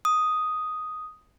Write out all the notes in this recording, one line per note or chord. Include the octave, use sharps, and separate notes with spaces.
D#6